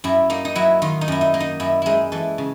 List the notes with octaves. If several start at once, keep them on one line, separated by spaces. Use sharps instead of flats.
F#2 E4
A#3 D#4
D#4
F#3 E4
D#3 F4
D#4
F#2 E4
D#4
A#3
D#4
F#2 E4
G#3 D#4 E4
E3 A4
C#3